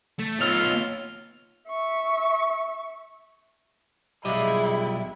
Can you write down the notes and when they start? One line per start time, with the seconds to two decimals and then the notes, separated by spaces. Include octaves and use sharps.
0.19 A3
0.41 B3 D#4 F4 C#5 E6 F6 F7
1.69 E5 C#6
4.25 B1 G3 G#3 E4 F4 G4 D#5